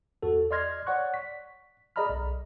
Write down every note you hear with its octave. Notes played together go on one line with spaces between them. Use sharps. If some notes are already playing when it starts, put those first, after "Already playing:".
E2 F#4 A4
D5 D#5 C6 F6 G#6 A#6
C#5 D5 F#5 C#6 F#6
B6
G#4 D5 D#5 A#5 B5 F6
B1